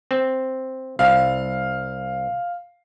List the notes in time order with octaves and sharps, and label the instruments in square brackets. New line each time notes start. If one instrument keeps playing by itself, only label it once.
[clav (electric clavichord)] C4
[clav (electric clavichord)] C2 [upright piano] F5